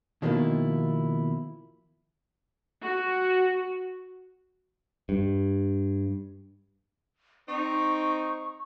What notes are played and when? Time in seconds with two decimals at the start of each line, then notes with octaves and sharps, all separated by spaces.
0.22 B2 D#3 F3 A#3 E4 F4
2.82 F#4
5.09 G2
7.48 C4 D#4 C#6